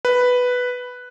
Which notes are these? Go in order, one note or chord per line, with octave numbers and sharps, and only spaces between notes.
B4